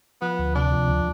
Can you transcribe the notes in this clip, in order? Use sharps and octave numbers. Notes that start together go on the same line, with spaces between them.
F3 B3
D2
C3 D4
F3
D2